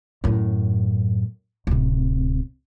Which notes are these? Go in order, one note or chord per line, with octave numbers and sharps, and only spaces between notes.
F#2 A2
D1 C3